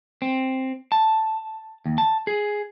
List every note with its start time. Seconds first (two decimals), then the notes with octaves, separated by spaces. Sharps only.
0.22 C4
0.92 A5
1.86 D#2
1.98 A5
2.27 G#4